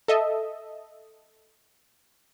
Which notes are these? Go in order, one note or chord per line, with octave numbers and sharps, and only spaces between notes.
A4 D#5 E5